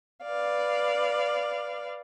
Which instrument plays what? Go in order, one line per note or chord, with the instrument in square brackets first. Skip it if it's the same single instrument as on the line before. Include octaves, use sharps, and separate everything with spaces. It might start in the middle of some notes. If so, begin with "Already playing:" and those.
[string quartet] B4 D5 F5